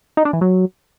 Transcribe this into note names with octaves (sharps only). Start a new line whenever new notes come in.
D#4
D4
E3
F#3